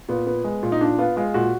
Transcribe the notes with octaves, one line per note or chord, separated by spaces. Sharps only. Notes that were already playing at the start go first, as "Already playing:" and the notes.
A#2 B3
B3
G#3
A#2
D#4
A#2 D4
B3 F4
G#3 F4
A#2 F#4